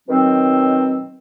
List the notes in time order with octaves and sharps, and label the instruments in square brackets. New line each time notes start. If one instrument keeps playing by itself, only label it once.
[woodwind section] B2 D#3 F#3 C4